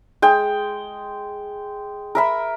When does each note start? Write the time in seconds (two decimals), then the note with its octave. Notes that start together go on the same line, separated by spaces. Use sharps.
0.22 G#3 G5
2.15 A#4 E5 B5